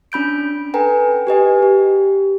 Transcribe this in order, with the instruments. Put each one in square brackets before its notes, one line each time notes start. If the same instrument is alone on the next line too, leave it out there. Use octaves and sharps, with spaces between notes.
[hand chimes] C#4 D4 B5 G6 D7
A4 B4 G5 G#5 A#5
G4 B4 D#5 G#5
G4